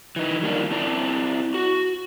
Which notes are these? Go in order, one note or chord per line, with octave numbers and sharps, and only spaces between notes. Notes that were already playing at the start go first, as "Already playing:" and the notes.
E3 D#4
D#3 G3 A#3 D4
C4 E4 D5 A5 A#5
F#4